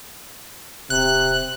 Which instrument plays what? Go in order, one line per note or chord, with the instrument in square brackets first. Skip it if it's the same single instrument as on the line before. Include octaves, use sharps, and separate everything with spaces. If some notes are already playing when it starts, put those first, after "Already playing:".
[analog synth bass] D1 [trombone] C3 [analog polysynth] F#6